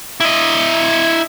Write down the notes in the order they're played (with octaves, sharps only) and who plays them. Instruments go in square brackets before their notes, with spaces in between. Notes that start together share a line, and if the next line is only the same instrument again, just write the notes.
[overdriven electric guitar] E4 D#5